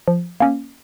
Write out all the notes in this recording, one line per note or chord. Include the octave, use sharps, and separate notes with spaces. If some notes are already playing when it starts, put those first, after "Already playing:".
F3
A#3 C#4